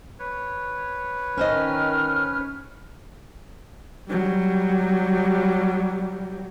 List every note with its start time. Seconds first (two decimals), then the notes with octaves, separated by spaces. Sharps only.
0.19 B4 C#5
1.38 D#3 C#4 C5 D#5 F6
4.10 F#3 G3